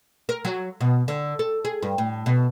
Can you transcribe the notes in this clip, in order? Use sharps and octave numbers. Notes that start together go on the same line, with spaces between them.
A#4
F#3
B2
D3
A4
G#4
G2
A2
B2